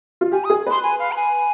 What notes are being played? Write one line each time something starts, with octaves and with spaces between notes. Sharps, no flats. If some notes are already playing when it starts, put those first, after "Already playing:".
F4
G4 G#5
D#6
G#4
B4 C6
G#5
F5
B5
G#5